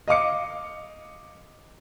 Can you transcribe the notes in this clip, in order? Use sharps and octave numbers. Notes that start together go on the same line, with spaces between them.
D#5 F5 D6 C#7